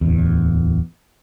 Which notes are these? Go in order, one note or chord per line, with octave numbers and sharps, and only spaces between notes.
D1 E2